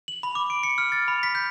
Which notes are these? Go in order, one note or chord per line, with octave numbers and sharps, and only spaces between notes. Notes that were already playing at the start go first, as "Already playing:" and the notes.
F#7
B5
D6
D7
C#7
F6
A6
B5
B6
G6